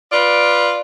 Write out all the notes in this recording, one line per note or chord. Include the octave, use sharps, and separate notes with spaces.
F4 B4 D5